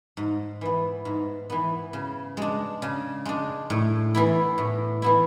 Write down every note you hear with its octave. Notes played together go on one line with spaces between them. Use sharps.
G#2
E3 B3
G#2
E3 B3
C#3
G#3 D4
C#3
G#3 D4
A2
E3 B3 E4
A2
E3 B3 E4